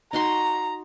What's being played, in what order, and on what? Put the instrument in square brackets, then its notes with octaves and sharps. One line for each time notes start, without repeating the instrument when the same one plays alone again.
[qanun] D#4 F#4 C6 [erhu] A#5